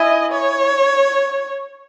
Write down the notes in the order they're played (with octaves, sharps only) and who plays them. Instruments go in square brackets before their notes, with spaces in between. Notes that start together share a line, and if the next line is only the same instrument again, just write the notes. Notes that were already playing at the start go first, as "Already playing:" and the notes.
Already playing: [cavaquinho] E4 E5 G#5 [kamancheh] D#5
[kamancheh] C#5